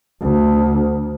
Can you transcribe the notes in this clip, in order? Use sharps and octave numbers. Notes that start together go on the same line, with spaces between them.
D2